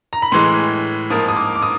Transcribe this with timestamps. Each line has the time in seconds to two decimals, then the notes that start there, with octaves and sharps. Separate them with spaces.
0.13 A#5
0.22 B5
0.32 A2 E3 G#3 C6
1.10 G#2 F3 A#3 D#6
1.28 D#6
1.36 D6
1.56 D6
1.62 D#6